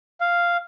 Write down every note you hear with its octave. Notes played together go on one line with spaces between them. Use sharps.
F5